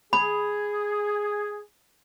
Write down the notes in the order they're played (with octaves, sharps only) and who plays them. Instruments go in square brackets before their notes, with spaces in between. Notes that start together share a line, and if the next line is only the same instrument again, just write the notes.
[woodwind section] G#4 [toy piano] B5